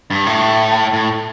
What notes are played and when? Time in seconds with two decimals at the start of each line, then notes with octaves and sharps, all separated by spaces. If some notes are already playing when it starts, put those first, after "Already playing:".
0.10 G2
0.27 A2
0.93 A2